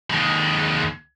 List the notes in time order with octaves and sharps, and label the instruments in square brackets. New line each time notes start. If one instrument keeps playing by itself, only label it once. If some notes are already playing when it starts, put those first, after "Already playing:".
[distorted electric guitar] D#2 G#3